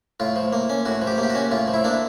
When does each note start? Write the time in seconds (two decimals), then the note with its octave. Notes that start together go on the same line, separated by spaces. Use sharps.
0.20 A2 F4
0.36 F3
0.53 A#3
0.70 C#4
0.85 A2 F#4
1.02 F3
1.07 G4
1.18 A#3
1.23 G4
1.30 F#4
1.35 C#4
1.51 A2 F4
1.68 F3
1.74 E4
1.84 A#3 D4